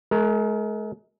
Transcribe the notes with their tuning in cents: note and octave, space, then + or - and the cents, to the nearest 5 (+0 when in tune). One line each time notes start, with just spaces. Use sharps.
G#3 +40 A#4 +0